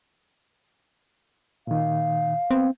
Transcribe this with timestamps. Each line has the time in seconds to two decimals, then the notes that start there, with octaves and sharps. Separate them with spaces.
1.67 A#2 D#3 F5
2.51 B3 C4